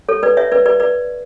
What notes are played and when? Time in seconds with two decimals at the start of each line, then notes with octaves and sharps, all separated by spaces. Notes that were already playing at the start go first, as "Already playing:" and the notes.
0.09 A4 C#5
0.23 B4 D5
0.37 C#5 E5
0.51 B4 D5
0.66 B4 D5
0.80 B4 D5